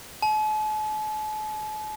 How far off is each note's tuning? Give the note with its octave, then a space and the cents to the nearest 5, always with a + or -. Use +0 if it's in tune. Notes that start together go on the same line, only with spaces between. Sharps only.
A5 -45